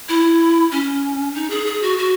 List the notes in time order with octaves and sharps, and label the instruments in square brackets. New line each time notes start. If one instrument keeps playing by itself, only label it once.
[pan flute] E4
C#4
D#4
G#4
G#4
F#4
F#4